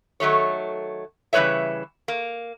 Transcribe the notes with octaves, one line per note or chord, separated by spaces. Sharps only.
D#3 F#3 A3 C#5
C#3 E3 G3 B4 C#5 E5
A#3